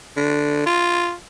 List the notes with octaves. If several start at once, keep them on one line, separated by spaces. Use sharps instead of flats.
D3
F4